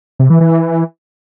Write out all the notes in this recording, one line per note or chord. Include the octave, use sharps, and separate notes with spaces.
C3
E3
E3
E3